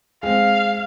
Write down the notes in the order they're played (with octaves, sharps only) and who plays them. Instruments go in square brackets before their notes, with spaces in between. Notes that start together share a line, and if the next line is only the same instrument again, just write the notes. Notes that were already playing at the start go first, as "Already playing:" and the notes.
[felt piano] G#3 C4 [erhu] F5